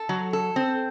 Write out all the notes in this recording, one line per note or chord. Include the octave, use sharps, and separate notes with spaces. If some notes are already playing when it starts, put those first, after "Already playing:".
Already playing: A4
F#3
A4
C4